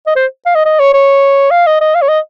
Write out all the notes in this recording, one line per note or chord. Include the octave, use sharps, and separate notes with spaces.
D#5
C5
F5
D#5
D#5
C#5
C#5
F5
D#5
D#5
F5
C#5
D#5